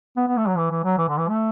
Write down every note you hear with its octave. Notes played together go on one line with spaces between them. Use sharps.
B3
B3
A3
F#3
E3
E3
F#3
E3
D3
E3
A3